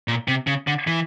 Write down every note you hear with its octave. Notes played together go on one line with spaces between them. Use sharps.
A#2
C3
C#3
D3
E3